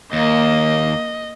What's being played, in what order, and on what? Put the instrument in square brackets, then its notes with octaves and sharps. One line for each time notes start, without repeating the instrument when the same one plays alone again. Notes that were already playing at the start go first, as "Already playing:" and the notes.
[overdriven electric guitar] D#2 [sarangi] A#3 [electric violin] D#5